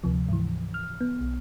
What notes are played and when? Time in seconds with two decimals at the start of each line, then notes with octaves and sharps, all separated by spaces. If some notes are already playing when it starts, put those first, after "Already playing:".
0.04 D2 C3 F3
0.28 G#2 E3
0.74 F6
1.01 B3
1.21 B1